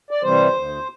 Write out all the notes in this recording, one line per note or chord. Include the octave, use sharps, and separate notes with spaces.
D5
C3 E3 G3 C5
D2